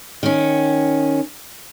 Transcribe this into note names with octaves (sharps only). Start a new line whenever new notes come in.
D#3 C#4